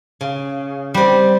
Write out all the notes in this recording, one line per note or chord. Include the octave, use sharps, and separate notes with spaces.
C#3
G3 C4